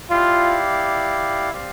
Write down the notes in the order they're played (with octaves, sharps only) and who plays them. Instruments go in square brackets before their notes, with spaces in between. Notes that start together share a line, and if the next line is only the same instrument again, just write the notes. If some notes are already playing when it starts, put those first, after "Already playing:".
[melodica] E4 G4 D5 F5 [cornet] F4
[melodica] C4 G4 D5 F5